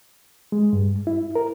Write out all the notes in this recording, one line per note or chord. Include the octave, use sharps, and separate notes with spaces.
G#3
G2
E4
A#4